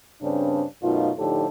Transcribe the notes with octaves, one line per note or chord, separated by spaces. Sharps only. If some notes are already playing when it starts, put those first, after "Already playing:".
G2 C#3 C4 D4
F#2 B2 A3 D#4 F4
A2 D3 F3 D#4 G4 A4